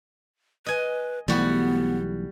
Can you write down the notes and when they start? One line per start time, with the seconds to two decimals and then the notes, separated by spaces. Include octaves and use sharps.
0.66 B4 D#5 G#5
1.28 B1 E3 G3 A3 B3 F#4